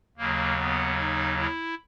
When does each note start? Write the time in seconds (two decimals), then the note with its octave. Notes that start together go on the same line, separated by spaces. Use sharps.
0.17 D#2 C#3 F#3 A#3
0.58 B3
0.98 D#4
1.39 E4